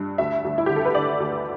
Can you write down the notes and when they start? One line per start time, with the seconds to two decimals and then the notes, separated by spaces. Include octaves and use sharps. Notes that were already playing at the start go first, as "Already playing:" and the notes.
Already playing: G2
0.18 D2 E5
0.45 D2
0.58 E4
0.66 D3 G4
0.76 A4
0.85 B4
0.94 D3 D5
1.20 D2